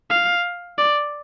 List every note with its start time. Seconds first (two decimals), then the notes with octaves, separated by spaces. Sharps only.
0.10 F5
0.78 D5